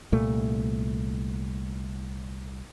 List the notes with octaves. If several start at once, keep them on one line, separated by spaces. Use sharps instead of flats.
C2 A#2 A3